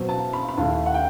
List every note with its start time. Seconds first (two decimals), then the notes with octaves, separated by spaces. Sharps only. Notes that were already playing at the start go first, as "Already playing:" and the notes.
Already playing: B2 F#3 C4
0.09 A5
0.33 B5
0.49 B5
0.57 D#2 D#3 A3 E4 A5
0.86 F#5
0.94 G5